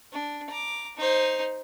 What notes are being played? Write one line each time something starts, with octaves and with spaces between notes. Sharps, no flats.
D4
A#5 D6
D#4 C5